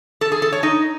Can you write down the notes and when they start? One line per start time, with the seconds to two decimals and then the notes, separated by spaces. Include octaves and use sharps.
0.21 A4
0.32 G#4
0.42 A4
0.52 C#5
0.63 D#4